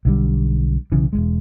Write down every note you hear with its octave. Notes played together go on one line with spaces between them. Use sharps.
B1 D3 G3
B1 C#3 E3
E1 C#2 G#3